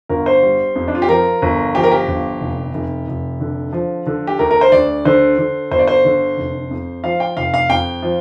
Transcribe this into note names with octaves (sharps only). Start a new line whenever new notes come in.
G1 A#4
C5
G3
F2
D4
F4
G4
F3 A#4
G1
F3 G4
A#4
G4
G1
F1
F1
F1
D3
F3
D3
G4
D2 A#4
A#4
C5
D2 D5
D3 C5
D3
G1 C5
D5
C5
D3
F1
F2
F3 F5
G5
F1 F5
F5
F2 G5
F3